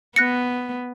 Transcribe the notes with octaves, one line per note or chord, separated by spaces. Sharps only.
B3 F#6 A#6 C#7